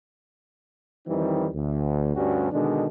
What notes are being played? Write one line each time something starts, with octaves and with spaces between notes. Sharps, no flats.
F2 D#3 E3 G3 C4 D#4
D2
D2 G2 G3 C#4 F#4 G4
B2 D3 D#3 G#3 D4